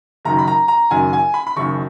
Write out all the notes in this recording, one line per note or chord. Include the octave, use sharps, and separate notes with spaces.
F#1 F#2 D#3 A#5
B5
A#5
A#5
F#1 F#2 D#3 G#5
G#5
B5
B5
F#1 F#2 D#3 C#6